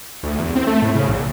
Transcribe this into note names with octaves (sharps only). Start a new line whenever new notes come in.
D2
E2
C4
A3
A2
C#3
A#1